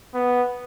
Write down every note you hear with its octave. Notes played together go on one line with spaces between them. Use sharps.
B3